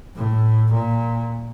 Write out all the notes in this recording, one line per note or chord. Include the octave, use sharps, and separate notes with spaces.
A2
A#2